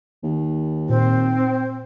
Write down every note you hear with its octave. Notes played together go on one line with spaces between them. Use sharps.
D#2
A#2 C4 C5